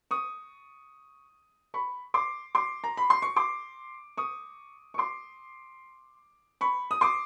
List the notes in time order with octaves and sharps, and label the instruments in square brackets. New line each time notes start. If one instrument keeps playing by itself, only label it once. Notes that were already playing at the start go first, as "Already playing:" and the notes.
[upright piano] C#6 D#6
B5 C#6
C6 D6
C6 D6
A#5
B5
C6
C#6
C6 D6
C#6 D#6
C#6
C6 D6
B5 C#6
D#6
C6 D6